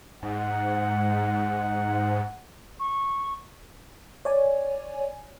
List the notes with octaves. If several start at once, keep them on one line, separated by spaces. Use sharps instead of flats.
G#2 F#5
C#6
C#5 D5 G#5